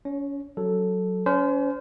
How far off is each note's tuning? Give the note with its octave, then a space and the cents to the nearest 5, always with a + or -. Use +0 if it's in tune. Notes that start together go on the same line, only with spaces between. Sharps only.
C#4 +30 C#5 -5
F#3 +0 A4 +0
C#4 +30 C5 -25